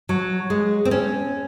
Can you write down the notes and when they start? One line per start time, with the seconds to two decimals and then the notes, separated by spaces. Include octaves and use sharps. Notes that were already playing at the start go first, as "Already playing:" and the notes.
0.09 F#3
0.50 G#3
0.85 C4
0.91 C#4